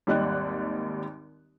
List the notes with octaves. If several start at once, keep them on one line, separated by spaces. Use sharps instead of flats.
G#1 D#2 G3 D#5 F#6